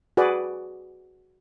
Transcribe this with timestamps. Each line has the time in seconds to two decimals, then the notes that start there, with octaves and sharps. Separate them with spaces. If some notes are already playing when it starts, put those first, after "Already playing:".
0.17 F#4 G#4 B4 D5